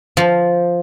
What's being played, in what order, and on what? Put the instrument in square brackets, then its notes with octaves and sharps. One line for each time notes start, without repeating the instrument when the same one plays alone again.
[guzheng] F3